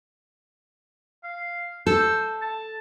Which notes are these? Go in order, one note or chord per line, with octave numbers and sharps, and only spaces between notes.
F5
A4 C5
A5